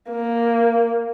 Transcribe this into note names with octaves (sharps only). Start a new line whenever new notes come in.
A#3